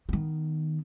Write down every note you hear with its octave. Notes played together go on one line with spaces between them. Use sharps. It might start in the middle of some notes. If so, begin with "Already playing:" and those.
D#3 B3